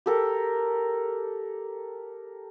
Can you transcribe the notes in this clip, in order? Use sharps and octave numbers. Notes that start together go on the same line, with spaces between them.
G4 A4 A#4